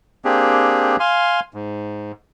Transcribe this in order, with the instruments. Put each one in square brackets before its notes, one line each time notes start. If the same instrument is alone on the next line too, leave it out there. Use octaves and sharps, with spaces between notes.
[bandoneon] A#3 C4 D4 G4 G#4
F5 G#5 C6
G#2